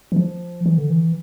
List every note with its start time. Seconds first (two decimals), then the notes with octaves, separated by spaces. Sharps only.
0.12 E3
0.16 F3
0.66 E3
0.78 D3
0.90 E3